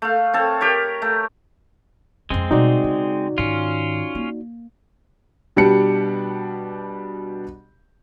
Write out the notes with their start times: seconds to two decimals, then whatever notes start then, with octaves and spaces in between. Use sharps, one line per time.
0.02 A3 F5
0.34 C4 A4 C#5
0.61 G4 A#4 C#5
1.02 A3
2.30 F2 G#3 C4 C#4
2.51 B2 G3 D#4 F#4 D5
2.84 C#3
3.38 G#2 D#3 C#4 F4
4.15 A#3
5.56 B2 G3 D4 G4 C#7